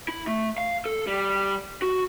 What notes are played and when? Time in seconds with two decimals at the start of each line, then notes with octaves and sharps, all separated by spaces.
0.08 E4
0.27 A3
0.58 F5
0.86 A4
1.07 G3
1.82 F#4